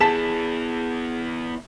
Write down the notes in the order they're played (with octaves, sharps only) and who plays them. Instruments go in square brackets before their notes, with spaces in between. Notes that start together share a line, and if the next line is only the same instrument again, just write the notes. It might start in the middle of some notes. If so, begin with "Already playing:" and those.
[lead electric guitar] B3 E4 [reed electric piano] G#4 [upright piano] A5 B6 E7